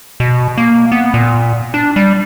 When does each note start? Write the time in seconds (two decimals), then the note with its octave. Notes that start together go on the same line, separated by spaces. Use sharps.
0.20 B2
0.58 A#3
0.92 B3
1.14 A#2
1.74 D4
1.96 G3